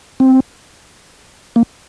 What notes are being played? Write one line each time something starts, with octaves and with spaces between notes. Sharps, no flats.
C4
A#3